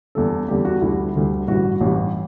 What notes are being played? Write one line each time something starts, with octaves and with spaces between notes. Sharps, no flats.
E2 D3 G3 A4
E2 D3 G3 G4
F#4
D2 D3 G3 E4
D2 D3 G3
A1 G2 E3 G3 F#4
A1 G2 E3 G3 G4